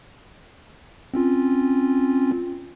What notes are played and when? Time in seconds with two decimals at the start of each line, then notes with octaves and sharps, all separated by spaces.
1.14 C4 C#4 F4